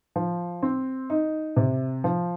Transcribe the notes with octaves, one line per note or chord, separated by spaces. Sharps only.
F3
C4
D#4
C3
F3